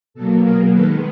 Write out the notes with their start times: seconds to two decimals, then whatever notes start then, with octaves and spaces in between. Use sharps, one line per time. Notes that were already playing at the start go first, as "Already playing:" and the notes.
0.14 B2 F#3 A#3 A4
0.43 G#4 A#4
0.72 D#3 G#3 B3 A4 B4